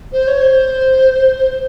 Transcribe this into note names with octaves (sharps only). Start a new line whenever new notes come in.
C5
C#5
C5